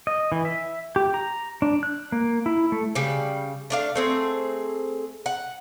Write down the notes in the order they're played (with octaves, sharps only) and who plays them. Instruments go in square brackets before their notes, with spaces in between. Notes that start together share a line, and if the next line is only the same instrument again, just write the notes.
[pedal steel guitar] D#5
E3
E5
G4
A#5
D4
F#6
A#3
E4
A3
[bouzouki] C#3 G3
A3 D4 F5
A3 C4 G#4
F#5